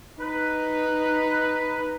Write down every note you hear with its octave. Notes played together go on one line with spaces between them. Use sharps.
D#4 B4